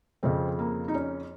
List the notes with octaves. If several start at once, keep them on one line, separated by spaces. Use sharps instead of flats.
F2 C#3 C4
A#3
D#4
C#4